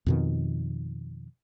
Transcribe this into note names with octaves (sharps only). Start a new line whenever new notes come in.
F2 B2 D#3